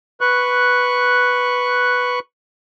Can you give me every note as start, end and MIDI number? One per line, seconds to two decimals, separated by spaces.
0.21 2.19 71
0.21 2.19 85
0.21 2.19 90